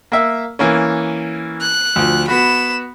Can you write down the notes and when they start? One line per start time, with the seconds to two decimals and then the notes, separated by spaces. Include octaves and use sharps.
0.12 A#3 E5
0.59 E3 A#3 C#4
1.61 F#6
1.96 D2 F3
2.28 B3 F#4 B5 E7